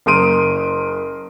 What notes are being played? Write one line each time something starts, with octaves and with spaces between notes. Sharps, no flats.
F#1 A#4 C6 D#6 D7 D#7